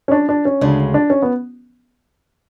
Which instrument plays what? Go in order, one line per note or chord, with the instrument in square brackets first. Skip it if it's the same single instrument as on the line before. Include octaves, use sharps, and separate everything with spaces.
[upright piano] C#4
D4
D4
C#4
[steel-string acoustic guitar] D2 C#3 G#3 [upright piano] D4
[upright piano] D4
C#4
B3